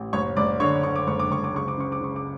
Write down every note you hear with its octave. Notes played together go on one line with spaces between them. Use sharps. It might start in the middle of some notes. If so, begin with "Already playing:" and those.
Already playing: A1
F#1 C#5 C#6
F#1 D5 D6
D3 C#5 C#6
D3 C#6
D6
F#1 C#6
D6
F#1 C#6
D6
C#2 C#6
D6
C#3 C#6
D6
C#3 C#6
D6